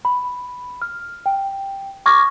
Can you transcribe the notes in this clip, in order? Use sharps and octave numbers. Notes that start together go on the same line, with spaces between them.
B5
F6
G5
C#6 D6 F6 G#6 A#6